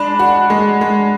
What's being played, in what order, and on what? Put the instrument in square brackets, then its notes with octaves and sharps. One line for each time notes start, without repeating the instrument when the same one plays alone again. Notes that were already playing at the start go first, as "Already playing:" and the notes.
Already playing: [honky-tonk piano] G#3 D4 [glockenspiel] B5
[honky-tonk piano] F#4
G#3
G#3